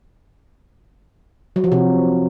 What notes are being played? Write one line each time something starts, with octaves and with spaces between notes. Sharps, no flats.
F#3
F3
C3